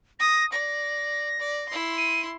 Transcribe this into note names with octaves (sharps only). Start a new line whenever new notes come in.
D#6 A#6
D5 A#6
D5
E4 C6
D#7